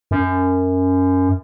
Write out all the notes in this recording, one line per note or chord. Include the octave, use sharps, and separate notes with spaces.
F#2